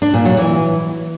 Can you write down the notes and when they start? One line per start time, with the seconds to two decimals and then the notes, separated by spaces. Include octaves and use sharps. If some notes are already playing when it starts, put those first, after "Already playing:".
0.02 D4
0.14 A#2
0.25 F#3
0.37 E3